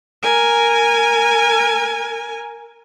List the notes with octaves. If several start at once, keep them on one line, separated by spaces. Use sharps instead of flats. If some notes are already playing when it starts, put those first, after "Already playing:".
A#4 G#5